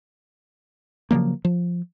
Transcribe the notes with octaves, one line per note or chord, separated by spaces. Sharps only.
C#3 F3 F#3 A#3
F3